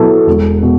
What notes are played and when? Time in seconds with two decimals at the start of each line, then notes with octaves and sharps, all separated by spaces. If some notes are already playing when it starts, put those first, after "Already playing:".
Already playing: B2 F#3 B3 E4 A4
0.27 E1
0.63 B2